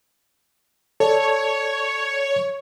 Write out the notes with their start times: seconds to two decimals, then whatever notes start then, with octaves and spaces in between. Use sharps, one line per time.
1.00 A4 C#5 D5 A5